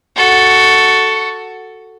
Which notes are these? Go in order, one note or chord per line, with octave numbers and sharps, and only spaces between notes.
F#4 A4